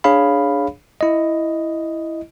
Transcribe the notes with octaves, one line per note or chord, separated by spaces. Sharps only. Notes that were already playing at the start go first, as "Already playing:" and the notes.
D4 G#4 C#5 F5 B5
E4 D#5